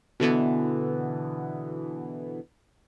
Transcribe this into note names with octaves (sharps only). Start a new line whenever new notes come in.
B2 D3 E3 B3